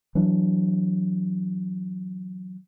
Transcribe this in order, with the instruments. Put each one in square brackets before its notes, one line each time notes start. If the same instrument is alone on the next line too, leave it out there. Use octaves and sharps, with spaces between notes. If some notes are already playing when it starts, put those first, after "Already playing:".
[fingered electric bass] E3 F#3 D4